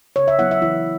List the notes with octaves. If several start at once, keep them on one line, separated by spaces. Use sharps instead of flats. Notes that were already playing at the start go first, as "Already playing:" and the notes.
C#3 C#5
E5
F#3 B3 E4 F#5
E5
E3 E4